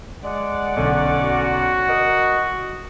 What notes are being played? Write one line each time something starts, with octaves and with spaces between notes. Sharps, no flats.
G#3 D5 F#5
B1 D3 C#4
F#4
A#4 D#5